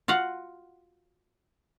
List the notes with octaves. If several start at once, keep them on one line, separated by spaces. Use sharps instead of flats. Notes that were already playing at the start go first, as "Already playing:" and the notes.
F4 F#4 F5 F#5